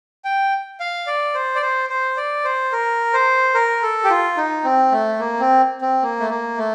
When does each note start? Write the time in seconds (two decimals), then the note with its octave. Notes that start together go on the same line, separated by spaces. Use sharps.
0.25 G5
0.80 F5
1.07 D5
1.34 C5
1.55 D5
1.62 C5
1.89 C5
2.17 D5
2.44 C5
2.73 A#4
3.13 C5
3.54 A#4
3.83 A4
4.04 G4
4.10 F4
4.37 D#4
4.64 C4
4.92 A3
5.19 A#3
5.40 C4
5.82 C4
6.03 A#3
6.20 A3
6.30 A#3
6.58 A3